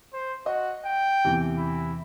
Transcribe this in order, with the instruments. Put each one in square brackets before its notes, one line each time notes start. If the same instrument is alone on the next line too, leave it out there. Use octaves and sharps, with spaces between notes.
[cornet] C5
[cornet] F#4 [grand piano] D#5
[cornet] G5
[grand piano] E2 C3 E3
[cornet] E4